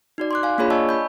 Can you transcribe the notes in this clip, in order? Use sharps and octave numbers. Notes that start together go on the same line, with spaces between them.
D#4 F#4 D5
C6 D6 F#6
F5 G#5
A#3 D4 F4 G#4 C#5 B5
D5 D#5 G#5 A5 C#6 E6
B5 G6